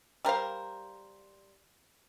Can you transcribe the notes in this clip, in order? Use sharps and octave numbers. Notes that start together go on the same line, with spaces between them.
G3 A#4 C5 F5